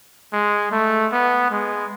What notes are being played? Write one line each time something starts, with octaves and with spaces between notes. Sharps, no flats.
G#3
A3
B3
G#3